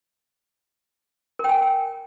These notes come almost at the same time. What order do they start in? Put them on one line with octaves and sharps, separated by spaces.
A#4 G5 G#5